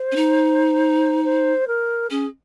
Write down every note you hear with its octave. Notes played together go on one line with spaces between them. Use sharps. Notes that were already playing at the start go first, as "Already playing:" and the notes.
Already playing: C5
C#4
D#4
C5
A#4
C#4 G#4